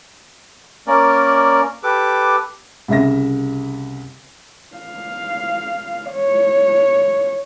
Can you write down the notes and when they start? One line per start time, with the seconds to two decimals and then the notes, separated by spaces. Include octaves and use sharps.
0.87 A#3 C#4 A#4 D5
1.84 G4 A4 B4 D6
2.88 C2 C#3 E5 A#6
4.76 F5
6.11 C#5